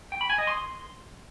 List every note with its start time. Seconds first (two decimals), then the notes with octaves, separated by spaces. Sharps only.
0.12 G5
0.21 B5
0.30 G#5
0.38 D#5
0.47 C6